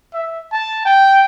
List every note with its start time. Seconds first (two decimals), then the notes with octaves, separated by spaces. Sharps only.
0.14 E5
0.52 A5
0.85 G5